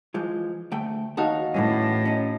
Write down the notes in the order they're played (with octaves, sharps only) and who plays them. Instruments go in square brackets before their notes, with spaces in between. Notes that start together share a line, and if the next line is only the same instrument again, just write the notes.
[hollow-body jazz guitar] E3 F3 G#3
D2 A3 G5
[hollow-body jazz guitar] D#2 A4 [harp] D#4 F#4 F5
[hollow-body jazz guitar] E2 E3 C#4 [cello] A2
[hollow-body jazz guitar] C#4 D#4